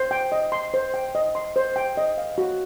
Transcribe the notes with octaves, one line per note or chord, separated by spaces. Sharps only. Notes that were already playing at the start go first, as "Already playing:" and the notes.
Already playing: C5
G5
D#5
C6
C5
G5
D#5
C6
C5
G5
D#5
F5
F#4